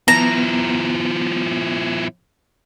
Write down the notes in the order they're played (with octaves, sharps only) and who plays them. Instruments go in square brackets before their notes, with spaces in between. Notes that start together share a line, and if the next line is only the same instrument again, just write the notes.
[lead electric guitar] F3 E4 [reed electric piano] B3 [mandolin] A#5